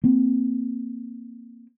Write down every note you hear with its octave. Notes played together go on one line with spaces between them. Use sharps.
A#3 C4